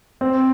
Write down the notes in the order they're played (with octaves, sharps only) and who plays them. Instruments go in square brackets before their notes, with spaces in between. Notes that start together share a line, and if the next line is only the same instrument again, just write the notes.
[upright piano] C4